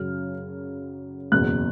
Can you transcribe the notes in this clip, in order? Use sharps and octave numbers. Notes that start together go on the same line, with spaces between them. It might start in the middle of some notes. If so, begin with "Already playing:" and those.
Already playing: F#2 C#3 F#3 F6
F#1 E2 B2 F#6